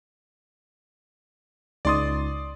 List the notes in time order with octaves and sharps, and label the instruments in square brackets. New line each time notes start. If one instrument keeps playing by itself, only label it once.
[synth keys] C#2 D#4 A6 [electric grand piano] D5 C6 D#6